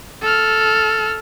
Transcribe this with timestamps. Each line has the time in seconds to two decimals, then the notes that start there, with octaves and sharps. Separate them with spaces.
0.22 A4 F6